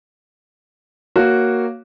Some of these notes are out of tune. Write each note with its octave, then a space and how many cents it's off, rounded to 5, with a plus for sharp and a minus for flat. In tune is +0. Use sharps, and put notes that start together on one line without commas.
A#3 +0 F#4 +0 C#5 +0